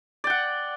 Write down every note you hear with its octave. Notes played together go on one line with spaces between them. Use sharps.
D5 F#5 G5